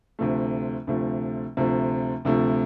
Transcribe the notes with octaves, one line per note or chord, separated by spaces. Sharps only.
D2 C3 F3 A3
D2 C3 F3 A3
D2 C3 F3 A3
D2 C3 F3 A3